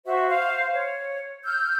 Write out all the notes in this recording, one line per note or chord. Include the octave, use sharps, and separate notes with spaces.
F#4 C5 E5
C5 F5
C#5
E6 F6 G6